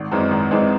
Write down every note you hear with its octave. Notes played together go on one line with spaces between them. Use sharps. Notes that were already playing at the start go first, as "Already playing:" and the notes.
Already playing: G#1
F#2 E3 G#3 C4
G#1
F#2 E3 G#3 C4